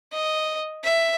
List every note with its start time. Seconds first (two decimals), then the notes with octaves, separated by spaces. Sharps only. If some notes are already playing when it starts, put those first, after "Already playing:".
0.13 D#5
0.84 E5